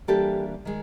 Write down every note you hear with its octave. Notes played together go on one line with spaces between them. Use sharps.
E3 G3 A#3 D4 G4 A4
D#3 G#3